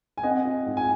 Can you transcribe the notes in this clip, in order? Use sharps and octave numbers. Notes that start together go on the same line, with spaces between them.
G#5
C4 D#5 F#5
F4
G#2
G#5